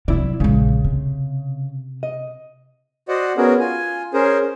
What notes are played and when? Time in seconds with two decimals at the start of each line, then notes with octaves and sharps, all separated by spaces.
0.08 C3 F#3 E4 D5
0.40 A#1 C#3 G#3
0.84 C3
2.03 D#5
3.08 F#4 C5 D5 D#5 F#5
3.37 B3 C#4 F#4 G#4 A#4
3.60 F4 G#5
4.14 C#4 G#4 A#4 C5